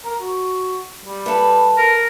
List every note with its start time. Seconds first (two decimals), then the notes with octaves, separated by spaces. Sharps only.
0.05 A#4
0.22 F#4
1.05 G3
1.26 A4 B4
1.78 A#4